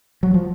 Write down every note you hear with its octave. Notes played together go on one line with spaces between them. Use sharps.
F#3
F3